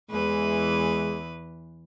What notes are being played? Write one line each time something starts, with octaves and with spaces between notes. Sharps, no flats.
E2 E3 G#3 B4